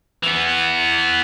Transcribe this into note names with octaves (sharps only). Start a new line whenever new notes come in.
E3 B3